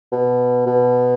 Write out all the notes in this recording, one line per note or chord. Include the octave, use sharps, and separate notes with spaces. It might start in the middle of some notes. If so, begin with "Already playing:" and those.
B2
B2